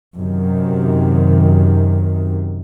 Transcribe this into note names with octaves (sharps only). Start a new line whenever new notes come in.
F#2 C3 D#3